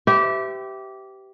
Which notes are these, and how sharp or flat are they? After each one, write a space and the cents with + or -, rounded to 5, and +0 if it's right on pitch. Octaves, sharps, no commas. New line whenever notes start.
G4 -15 B4 +45 E5 +0